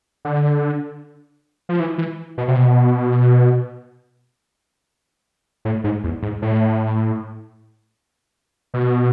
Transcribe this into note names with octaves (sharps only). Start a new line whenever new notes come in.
D3
F3
E3
E3
B2
C3
B2
A2
G#2
E2
G#2
A2
B2